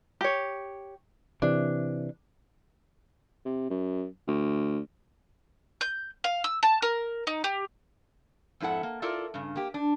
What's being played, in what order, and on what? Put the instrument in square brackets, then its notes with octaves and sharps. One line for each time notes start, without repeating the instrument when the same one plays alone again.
[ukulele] G4 C#5
[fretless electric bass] C3 E3 [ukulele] D4
[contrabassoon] C3
F#2
D2
[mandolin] G6
F5
E6
A5
A#4
D#4
G4
[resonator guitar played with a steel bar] F2 G#2 E4 A4 F#5
A#3
E4 F4 A4 A#4 D5
G2 C#3
A#3 G4
D4